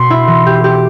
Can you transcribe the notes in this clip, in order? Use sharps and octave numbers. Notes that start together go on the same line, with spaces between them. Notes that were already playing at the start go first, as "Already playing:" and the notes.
Already playing: B2 C6
E4
E3
G4
G4